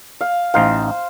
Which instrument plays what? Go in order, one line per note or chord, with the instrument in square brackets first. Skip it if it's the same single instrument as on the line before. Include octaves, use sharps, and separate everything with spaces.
[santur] F5
[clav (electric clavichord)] A1 D#4 F5 [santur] C5